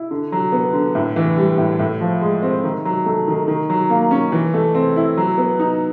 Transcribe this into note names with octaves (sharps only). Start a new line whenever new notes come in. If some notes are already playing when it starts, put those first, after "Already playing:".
Already playing: E4
D3
F#3
B3
D3
A2
E3
G3
A2
A2
F3
G#3
C4
D#3
F#3
A3
D#3
D#3
F#3
A#3
C#4
E3
A3
C4
E4
F#3
B3
D#4